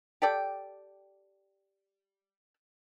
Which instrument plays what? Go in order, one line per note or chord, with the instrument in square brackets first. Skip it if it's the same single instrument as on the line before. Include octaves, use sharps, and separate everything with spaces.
[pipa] G4 A4 D5 G5